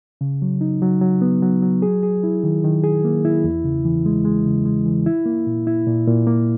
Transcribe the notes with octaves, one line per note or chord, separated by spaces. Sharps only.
C#3
F#3
D#4
F#3
F#3
B3
F#3
F#3
G#4
G#4
E4
D#3
D#3
G#4
A#3
E4
E2
C#3
E3
G#3
G#3
C#3
G#3
E3
E4
A#3
A#2
E4
A#2
A#2
A#3